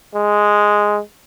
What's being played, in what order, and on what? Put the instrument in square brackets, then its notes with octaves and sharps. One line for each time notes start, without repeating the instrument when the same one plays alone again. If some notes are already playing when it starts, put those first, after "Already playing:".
[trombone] G#3